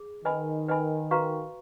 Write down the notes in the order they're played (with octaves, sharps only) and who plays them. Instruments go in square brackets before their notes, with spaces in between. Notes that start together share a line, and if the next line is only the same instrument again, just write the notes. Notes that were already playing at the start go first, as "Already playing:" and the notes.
Already playing: [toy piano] G#4
[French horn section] D#3 [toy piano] B4 D#5 G#5 B5
[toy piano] B4 D#5 G#5 B5
F#4 B4 F5 A#5 C#6